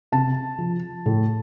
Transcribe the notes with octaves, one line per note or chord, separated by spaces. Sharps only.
C3 A5
F3
A2